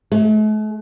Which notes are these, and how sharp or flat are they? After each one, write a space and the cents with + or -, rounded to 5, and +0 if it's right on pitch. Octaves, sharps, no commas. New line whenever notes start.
A3 -45